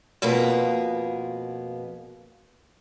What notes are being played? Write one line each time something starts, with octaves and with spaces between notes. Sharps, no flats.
F2 B2 A#3 B3 G#4